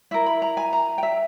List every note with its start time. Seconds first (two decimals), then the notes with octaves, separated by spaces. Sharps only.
0.11 E4 A#4 E5
0.26 B5
0.42 A#5
0.57 G#5
0.73 A#5
0.98 G5
1.03 E5